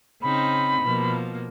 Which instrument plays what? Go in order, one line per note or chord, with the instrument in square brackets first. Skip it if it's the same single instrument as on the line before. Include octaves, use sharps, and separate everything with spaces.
[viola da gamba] C#3 C4 D#4 [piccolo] B5
[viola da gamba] B2 F3 A#3